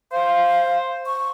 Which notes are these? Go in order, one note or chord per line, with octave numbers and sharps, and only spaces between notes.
C5 F5
C#6